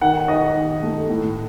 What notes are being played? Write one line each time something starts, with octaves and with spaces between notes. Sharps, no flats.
D#3 F#5
D#4 D#5
D#3
A3
A2